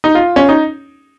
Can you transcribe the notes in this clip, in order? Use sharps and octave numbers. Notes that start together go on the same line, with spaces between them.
D#4
F4
C#4
D#4